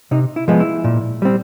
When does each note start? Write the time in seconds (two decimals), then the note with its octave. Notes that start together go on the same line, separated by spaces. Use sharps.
0.11 C3 D#4
0.36 E4
0.48 F3 G#3 B3
0.60 E4
0.84 A#2
1.22 G3 C4